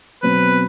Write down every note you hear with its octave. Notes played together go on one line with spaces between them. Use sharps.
B2 F#3 C4 B4